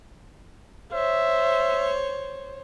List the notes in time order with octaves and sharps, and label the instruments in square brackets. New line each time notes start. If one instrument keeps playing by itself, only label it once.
[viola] C5 C#5 [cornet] E5